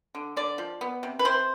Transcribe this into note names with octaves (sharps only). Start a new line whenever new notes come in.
D3
D3 D5
F3
B3
C3
B4
C3 C5